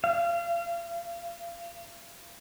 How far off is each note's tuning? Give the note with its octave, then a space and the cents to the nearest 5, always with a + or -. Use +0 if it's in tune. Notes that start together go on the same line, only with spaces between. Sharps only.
F5 -30